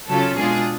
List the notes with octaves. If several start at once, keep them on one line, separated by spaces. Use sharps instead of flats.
C#3 F#3 C#4 F4 A4
B2 G#3 D4 F4 G#4